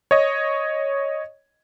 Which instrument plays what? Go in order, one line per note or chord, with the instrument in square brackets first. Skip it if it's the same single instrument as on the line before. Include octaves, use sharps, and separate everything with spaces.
[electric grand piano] C#5 D#5